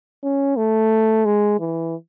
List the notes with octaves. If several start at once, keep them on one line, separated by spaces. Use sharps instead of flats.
C#4
A3
G#3
E3